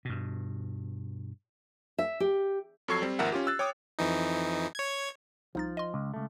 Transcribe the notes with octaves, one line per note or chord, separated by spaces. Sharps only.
G2 B2
E5
G4
F2 F#3 A4 C#6 G#6 C7
G3 C4
G#1 D#2 F3 A#4 E5 F#5
C#4 F4 G4
E6 F#6 A6
C#5 G5 D6 D#6
F2 E3 D#4
C#5 G#6
C2 F3 D#4 A6
D#5 C6
C#2
C#2 A3